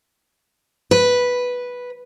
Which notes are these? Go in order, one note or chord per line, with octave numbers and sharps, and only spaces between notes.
B4